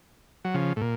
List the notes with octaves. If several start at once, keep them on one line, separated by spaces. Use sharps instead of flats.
F#3
C#3 F3
A2
A#2